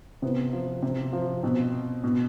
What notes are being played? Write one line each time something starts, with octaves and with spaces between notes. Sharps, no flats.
C3 B3
F3
C3
F3
B2 C4
B2